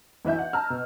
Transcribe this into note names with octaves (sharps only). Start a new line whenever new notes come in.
B1 E3 B4 E5 G6
F#5
A5 A#5 E6 F6
B2